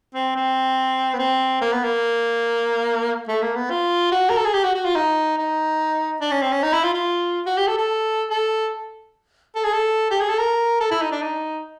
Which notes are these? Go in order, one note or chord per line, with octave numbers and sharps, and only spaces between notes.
C4
C4
B3
C4
A#3
B3
A#3
A3
A#3
B3
F4
F#4
A#4
A4
G#4
G4
F#4
F#4
F4
D#4
D#4
D4
C#4
C4
C#4
D#4
E4
F4
F4
F#4
G4
A4
A4
A4
A4
G#4
A4
G4
G#4
A4
A#4
A4
E4
D#4
D4
D#4